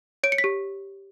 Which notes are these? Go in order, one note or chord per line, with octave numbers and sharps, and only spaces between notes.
C#5 D7
C#7
B6
G4